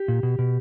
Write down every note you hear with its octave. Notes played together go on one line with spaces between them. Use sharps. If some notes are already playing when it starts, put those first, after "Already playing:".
Already playing: G4
A#2
B2
B2